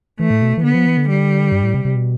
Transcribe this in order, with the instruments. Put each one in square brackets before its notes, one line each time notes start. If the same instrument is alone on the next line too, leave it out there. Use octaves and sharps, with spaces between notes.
[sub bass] E3 [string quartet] A3
[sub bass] A2
B2
E3
[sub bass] D3 [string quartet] B3
[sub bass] F3
E3
D3
[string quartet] G3
[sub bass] G2
A2
C3
C3
B2